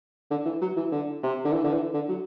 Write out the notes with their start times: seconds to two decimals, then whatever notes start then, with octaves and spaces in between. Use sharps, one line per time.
0.31 D3
0.46 E3
0.62 F#3
0.77 E3
0.92 D3
1.23 C3
1.45 D3
1.53 E3
1.64 D3
1.74 E3
1.94 D3
2.09 F#3